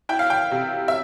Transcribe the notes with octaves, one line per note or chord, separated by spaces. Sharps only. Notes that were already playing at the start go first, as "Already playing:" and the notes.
E4 G5
F5
G5
C3
E5